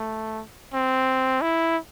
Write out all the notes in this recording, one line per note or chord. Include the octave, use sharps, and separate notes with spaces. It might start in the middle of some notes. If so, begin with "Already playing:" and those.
Already playing: A3
C4
E4